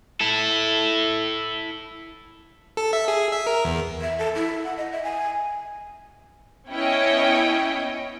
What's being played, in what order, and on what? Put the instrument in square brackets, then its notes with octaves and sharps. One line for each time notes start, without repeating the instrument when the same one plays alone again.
[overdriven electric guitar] E4 A4
[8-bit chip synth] A4
E5
G#4
E5
A#4
E2
[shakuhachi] E5
A4
E4
F#5
D#5
E5
G#5
[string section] B3 C#4 E4 C#5 D#5 G5